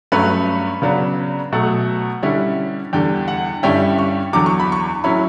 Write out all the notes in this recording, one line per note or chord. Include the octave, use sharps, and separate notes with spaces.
G2 F#3 A3 C#4 B4
C#3 F#3 B3 D4
B2 F#3 A3 F#5
D3 G3 C#4 E4
E2 D3 G3 G5
F#5
G2 D3 G3 C#4 E4 G5
C#6
E2 D3 F#3 D6
C#6
B5
C#6
A2 F#3 C#4 E4 B5